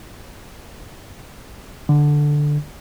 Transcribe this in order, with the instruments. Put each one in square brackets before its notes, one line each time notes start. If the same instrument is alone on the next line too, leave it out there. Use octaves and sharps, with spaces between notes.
[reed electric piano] D3